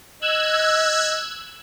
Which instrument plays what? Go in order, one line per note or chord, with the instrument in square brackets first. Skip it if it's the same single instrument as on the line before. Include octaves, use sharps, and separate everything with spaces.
[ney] D#5 [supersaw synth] E6 F#6 G#6